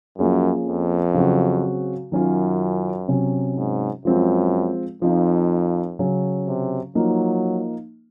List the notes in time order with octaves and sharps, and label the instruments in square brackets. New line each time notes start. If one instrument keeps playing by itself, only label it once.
[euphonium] F#2 [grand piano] F3 A#3 C#4 G#4
[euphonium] F2
[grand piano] C#3 F#3 C4 F#4
[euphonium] F#2 [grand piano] D#3 F#3 C#4 F4
[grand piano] C3 F#3 C#4
[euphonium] G#2
[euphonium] F#2 [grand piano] F3 G#3 C4 F4
[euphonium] F2 [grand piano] F3 C4 D#4
[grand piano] C#3 F#3 C#4
[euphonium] C3
[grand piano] F3 A#3 D#4 [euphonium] F#3